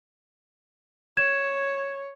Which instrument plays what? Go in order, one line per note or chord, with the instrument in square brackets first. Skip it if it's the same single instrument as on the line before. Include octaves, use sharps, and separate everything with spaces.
[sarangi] C#5 [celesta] G#6 E7